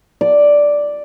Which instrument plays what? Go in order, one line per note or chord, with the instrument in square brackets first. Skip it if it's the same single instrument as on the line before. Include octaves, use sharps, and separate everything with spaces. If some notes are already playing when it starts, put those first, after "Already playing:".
[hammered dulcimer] D5